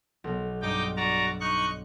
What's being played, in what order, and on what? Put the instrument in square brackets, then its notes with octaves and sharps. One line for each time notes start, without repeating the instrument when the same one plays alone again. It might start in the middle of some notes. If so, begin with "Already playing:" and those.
[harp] B1
[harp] G2 [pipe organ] D#4 G5 D6
[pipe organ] F#4 D5 A#5 [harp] D6
[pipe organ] D#4 C#6 F#6